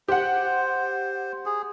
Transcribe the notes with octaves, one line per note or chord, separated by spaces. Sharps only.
G4 C5 F#5
G#4